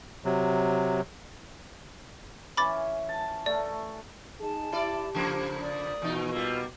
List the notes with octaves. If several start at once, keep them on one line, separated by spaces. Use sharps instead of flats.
C3 F#3
E3 C#4 B5 D6 A6
A5
A3 A#4 D5
D#4 G#4 A5
E4 G4 D5
C#3 F3 A#3
D5 D#6
E2 B2 D#4
G3 A#3 F4 E6